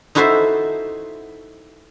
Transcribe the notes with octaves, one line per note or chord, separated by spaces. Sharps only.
D#4 E4 F#4 A4 C5 E5